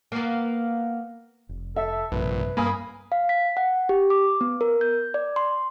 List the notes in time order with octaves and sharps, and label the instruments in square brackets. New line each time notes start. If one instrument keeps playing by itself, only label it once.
[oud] A#3 B3
[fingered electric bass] F1
[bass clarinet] A4 [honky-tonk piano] E5
[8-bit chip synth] A#1 [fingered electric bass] G2 C3 [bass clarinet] B4
[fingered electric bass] G2 G3 [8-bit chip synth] A#3 [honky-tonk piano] G#5 B5 D#6
[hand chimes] F5
B6
F#5
G4
D6
B3
A#4
G6
D5
C6